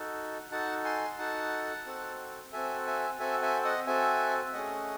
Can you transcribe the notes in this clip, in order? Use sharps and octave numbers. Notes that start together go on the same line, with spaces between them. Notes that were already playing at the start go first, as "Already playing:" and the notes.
Already playing: D#4 F#4 A4
D#4 F#4 A4 F#5 A5
G#5 C6
D#4 F#4 A4 F#5 A5
C4 F#4 A4
C4 F#4 A4 E5 G#5
E5 G#5
C4 F#4 A4 E5 G#5
E5 G#5
D#5 F#5
C4 F#4 A4 E5 G#5
A3 C#4 G#4 D#5 F#5